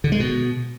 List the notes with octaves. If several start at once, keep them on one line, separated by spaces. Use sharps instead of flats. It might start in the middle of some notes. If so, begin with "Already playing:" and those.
D3
G#3
B2